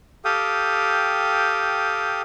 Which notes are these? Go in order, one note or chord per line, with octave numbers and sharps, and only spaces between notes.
G4 A4 F5 G5 D#6